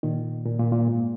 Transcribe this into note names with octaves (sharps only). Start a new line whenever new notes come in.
A#2 D#3
A#2
A#2
A#2
G#2